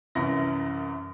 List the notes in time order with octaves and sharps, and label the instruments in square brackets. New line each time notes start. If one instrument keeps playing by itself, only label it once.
[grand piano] C2 F#2 E3 A#6